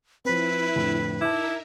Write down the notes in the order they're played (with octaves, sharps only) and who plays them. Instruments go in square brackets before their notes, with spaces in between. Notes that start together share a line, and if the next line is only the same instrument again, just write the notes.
[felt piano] F3 C4 [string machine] E4 [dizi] B4
[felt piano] F2 A2 D3
[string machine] D#4 A#4 E5 [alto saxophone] E4 [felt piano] A5 D6